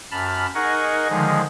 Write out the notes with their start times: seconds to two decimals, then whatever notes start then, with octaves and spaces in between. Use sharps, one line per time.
0.11 F#2 A5 B5 F6
0.55 D#4 G#4 A#4 D#5 F#5 C#6
1.10 D3 D#3 F3 G#3 D#4 G#4